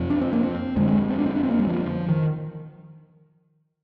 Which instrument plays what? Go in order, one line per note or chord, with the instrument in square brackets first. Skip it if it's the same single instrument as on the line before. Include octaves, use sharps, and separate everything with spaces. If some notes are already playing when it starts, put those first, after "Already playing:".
Already playing: [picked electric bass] F2 C3
D4
C4
A#3
C4
F2 D3 G#3
G#3
C4
D4
C4
D4
C4
A#3
G3
F3
D#3